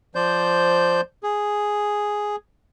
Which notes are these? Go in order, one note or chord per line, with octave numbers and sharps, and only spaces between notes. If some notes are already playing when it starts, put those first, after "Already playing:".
F3 C5 D5 G6
G#4